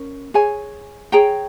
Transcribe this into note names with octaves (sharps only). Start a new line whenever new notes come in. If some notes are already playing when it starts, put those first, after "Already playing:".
Already playing: C#4 A#4
G#4 C#5 G#5
G#4 C#5 G5 A#5